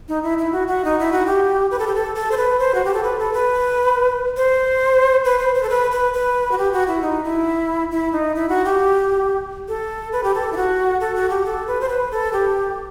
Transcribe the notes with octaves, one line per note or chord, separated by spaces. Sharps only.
D#4
E4
E4
F#4
F#4
D#4
E4
F#4
G4
B4
A4
G4
A4
A4
C5
B4
C5
F#4
G4
A4
B4
A4
B4
C5
B4
C5
C5
A4
B4
B4
B4
F#4
G4
F#4
E4
D#4
E4
E4
D#4
E4
F#4
G4
A4
B4
G4
A4
E4
F#4
A4
F#4
G4
A4
B4
C5
B4
A4
G4